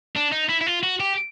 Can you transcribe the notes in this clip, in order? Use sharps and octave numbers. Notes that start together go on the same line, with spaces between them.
D4
D#4
E4
E4
F4
F#4
G4